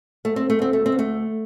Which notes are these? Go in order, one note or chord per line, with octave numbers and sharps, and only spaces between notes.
D2 A3
C4
A3
D2 C4
A3
C4
D2
A3